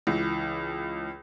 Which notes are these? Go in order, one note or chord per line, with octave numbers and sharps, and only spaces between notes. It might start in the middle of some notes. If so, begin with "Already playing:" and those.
C#2 E3